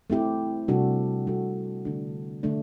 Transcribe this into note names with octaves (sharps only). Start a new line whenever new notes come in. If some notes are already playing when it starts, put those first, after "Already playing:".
A3 C4 E4 G4
C3 G3 D4 F#4 A4
C3 G3 D4 F#4 A4
D3 A3 D4
D3 A3 D4